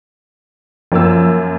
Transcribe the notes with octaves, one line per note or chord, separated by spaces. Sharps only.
F#2 F3 A#3 E6